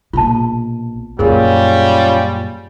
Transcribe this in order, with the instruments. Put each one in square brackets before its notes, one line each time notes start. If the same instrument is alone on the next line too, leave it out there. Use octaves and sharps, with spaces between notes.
[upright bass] A#1 B2 [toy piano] F4 A5
[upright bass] F#2 A#2 [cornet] G3 [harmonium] C#4 F4 [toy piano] G#4 A#4